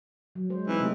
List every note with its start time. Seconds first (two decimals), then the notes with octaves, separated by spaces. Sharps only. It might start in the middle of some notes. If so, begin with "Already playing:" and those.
0.35 F#3
0.50 G#3 C5
0.68 E3 C4 D#4
0.80 C3 A3 G4